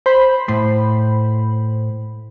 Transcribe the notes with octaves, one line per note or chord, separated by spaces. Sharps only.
C5 B5
A2 C6